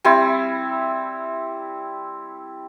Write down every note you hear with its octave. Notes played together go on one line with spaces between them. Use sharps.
G3 C4 E4